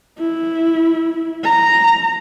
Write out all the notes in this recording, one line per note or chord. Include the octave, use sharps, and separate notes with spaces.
E4
A#5